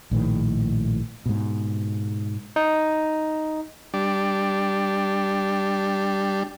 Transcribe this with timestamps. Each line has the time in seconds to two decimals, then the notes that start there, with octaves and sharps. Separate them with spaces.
0.11 A#1 A2 D#3
1.26 G#2 B2
2.56 D#4
3.94 G3 D4